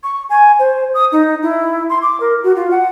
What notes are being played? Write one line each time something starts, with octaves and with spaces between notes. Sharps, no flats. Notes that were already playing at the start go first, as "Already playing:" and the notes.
C#6
G#5
C5
D#6
D#4
E4
C6
D6
A#4
F#4
F4
F#5